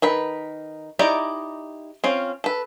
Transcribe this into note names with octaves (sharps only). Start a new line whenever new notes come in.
D#3 B4 B5
D#4 E4 G4 D5 D#5
C4 C#4 F4
A4 B4